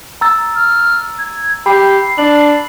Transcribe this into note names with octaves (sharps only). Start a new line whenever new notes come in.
A#5 E6 A6
F6
G#6
G4 B5 C7
D4 F#7